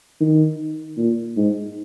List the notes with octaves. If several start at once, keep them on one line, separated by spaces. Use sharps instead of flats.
D#3
A#2
G#2